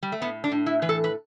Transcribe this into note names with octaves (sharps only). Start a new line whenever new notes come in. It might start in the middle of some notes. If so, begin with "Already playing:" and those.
G3
A3
A2 B3
D4
A2
E4
E3 B4
A4
B4